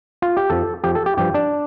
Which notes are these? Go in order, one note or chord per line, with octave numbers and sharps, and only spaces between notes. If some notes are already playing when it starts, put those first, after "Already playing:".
F4
G4
F2 F3 A4
F2 F3 G4
A4
G4
G2 F3 G4
D4